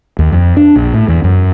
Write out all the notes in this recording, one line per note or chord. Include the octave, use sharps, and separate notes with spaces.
D#2
F2
D4
A#1
A2
E2
F#2